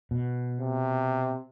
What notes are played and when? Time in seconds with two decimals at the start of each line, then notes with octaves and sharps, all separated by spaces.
0.11 B2
0.59 C3